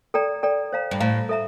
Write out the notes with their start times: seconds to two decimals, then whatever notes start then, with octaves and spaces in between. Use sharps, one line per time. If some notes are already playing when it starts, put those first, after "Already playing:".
0.14 A4 D5 G5 A#5
0.43 A4 D5 G5 A#5
0.73 C5 F5 A#5
0.91 G2
1.00 A2 C5 F5 A#5
1.29 A4 E5 A#5